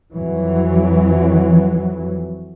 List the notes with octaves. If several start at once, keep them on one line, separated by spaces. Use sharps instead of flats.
F2 E3 F#3